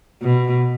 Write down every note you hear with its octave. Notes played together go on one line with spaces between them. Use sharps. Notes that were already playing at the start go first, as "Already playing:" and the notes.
B2